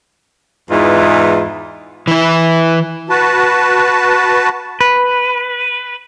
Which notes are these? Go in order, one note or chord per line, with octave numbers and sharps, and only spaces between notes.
E2 G#2 E3 F4 D#5
E3 E4
F#4 B4 A5
B4